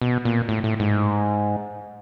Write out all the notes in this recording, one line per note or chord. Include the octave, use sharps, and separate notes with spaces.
B2
A#2
A2
A2
G#2